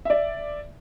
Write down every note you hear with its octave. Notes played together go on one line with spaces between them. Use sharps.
D5 E5